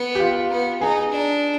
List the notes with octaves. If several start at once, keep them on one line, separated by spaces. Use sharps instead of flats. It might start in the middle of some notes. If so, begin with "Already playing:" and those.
Already playing: B3
G4
F4
B3
D#4 G#4
D4